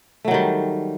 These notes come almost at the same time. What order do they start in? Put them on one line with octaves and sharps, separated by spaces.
A3 F#3 D#3 G3